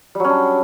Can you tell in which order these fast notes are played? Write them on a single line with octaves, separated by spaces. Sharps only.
G3 F#3 C#4 D4